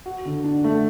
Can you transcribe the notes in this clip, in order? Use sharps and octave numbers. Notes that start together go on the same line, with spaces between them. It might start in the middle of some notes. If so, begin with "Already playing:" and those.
F#4
D3
D4
A3